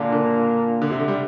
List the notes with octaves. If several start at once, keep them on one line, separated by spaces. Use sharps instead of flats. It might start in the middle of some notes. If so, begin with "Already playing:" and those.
Already playing: A#2 D3 A#3 D4
D3
D3
C3
D3
G3